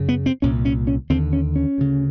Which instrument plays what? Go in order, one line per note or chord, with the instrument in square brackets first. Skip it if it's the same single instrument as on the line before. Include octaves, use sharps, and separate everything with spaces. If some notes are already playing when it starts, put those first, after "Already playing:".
Already playing: [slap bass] F#2 C#3
B3
C4
C2 A#2 C#4
C#4
C#4
D#2 D3 C4
C#4
C#4
D2 C#3